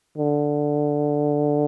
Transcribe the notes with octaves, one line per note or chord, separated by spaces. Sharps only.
D3